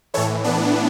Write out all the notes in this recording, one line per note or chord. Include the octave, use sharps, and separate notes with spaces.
A2 E3 A4 C#5
B3 D4